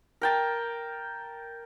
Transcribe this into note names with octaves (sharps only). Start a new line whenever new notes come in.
A#4 G5 A5